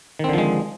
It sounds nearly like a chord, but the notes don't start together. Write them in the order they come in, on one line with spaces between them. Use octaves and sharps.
D#3 C4 D3 F3 G#3